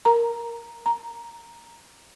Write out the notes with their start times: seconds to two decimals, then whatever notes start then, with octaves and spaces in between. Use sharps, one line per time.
0.05 A#4 A#5
0.86 A#5